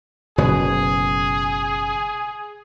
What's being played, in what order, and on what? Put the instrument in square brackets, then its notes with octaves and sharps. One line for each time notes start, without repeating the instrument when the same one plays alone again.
[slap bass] F#1 B2 F#3 [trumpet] G#4